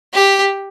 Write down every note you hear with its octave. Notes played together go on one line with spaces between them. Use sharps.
G4